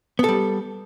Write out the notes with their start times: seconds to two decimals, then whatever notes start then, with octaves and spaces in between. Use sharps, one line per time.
0.19 B3
0.24 A4
0.29 G3